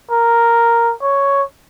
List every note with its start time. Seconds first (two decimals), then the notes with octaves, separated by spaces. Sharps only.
0.11 A#4
1.02 C#5